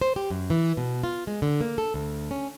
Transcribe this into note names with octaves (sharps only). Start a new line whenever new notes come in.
C5
G4
F#2
E3
B2
F4
G#3
D3
A#3
A4
D2
C#4